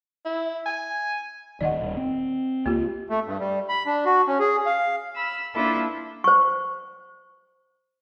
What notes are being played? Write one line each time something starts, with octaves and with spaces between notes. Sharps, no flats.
E4
G#5
D1 D#3 D5 D#5 F#5
D#1
C4
C#2 A#3 F4 G4
A3
G2
G3
B5
D4
F#4
C#4
G#4
F5
B5 E6 F6
A#3 D4 E4 F4 A4 B4
C5 C#6